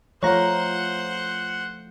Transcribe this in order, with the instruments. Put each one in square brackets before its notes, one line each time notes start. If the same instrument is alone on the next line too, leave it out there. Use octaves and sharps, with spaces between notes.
[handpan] F3 A3 F5 [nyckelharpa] C5 F#5 [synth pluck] C#5 A#5